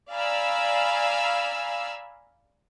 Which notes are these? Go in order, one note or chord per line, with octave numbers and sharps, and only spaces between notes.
D5 F5 G#5 A#5 B5 E6